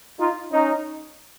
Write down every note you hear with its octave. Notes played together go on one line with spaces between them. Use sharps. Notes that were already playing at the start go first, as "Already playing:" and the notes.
D#4 F4
C#4 D#4